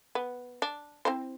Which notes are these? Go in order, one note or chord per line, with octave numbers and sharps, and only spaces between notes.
B3
D4
C4 E4 C5